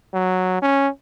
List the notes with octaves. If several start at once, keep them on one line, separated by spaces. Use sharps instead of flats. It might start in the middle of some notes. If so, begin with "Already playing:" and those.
F#3
C#4